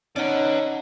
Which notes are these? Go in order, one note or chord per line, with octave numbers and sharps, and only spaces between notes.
C#4 D#4 B4 D5 F#5